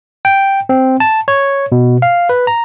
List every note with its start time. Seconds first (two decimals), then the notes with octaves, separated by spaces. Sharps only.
0.25 G5
0.69 C4
1.00 A5
1.28 C#5
1.72 B2
2.02 F5
2.29 B4
2.47 A#5